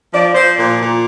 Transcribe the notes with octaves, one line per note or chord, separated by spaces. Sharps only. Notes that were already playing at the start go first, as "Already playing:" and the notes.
F3 D5
F3 C5
A#2 D5
A#2